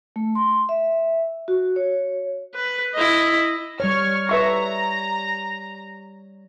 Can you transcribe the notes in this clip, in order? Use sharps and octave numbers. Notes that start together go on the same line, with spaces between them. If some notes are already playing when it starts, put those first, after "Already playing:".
A3
C6
E5
F#4
C#5
B4
E4 D#5
G3 C#5 C#6 F6
B4 E5 A#5 C#6